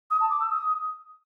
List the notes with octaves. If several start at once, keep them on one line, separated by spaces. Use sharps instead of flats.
D#6
A5
D6
E6
D#6